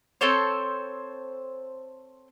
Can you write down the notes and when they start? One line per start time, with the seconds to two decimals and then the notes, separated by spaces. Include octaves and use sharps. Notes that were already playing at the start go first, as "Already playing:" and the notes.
0.21 C4 A4 C5 C#5